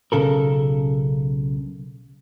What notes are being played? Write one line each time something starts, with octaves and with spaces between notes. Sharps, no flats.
B1 C#3 A4 A#4